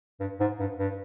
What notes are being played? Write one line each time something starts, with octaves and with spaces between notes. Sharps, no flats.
G2
G#2
G2
G2